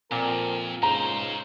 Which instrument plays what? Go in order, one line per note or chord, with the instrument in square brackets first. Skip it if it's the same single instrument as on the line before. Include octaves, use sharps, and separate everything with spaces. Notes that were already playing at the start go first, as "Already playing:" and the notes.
[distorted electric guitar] F2 [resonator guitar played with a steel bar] A#2 [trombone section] C4 A#4
[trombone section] C#2 G#2 C#3 [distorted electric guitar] D#4 C5 [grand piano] A#5 F7